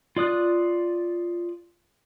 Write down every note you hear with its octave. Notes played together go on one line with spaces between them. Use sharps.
F4 D5 D#6 F#6